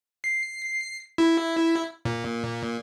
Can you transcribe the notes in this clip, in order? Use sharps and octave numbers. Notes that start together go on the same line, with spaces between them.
C7
E4
A#2